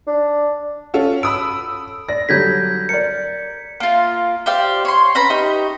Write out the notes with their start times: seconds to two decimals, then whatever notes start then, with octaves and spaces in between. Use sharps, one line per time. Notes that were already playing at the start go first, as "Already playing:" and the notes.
0.07 D4
0.94 C#4 F4 F#4 A4
1.23 B5 D#6 E6 D7
2.09 D5 A#6
2.29 D3 F#3 G3 G6 G#6 B6
2.89 A#4 D5 C#7
3.80 A#3 F4
4.46 G4 C5 D5 F5
4.85 C#5 C6
5.15 C#4 B4 A#5 B5
5.29 D#4 G4